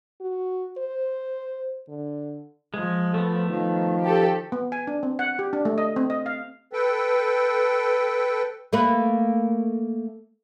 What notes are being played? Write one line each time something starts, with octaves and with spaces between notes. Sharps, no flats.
F#4
C5
D3
F3 G#3
A3 B3 A4
D#3 F3
G4 A4
B3
G#5
D4
C4
F#5
G4
D4
A3
D#5
C4
D#5
F5
A4 B4 G5
A3 A#3 B4